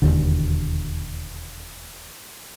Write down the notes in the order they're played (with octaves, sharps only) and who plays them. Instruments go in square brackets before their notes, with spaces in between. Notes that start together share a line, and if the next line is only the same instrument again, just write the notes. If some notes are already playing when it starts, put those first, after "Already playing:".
[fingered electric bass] E1 D#2 D3